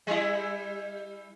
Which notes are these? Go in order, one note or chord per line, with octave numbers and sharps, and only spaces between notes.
G3 E4